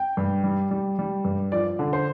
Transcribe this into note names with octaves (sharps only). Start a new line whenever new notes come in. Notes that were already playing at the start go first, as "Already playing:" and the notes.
Already playing: G5
G2
G3
G3
G3
G2
F3 D5
D3
C5